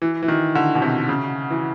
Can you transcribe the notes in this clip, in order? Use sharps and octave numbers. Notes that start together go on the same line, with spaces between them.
E3
E3
D#3
D3
B2
C3
C#3
E3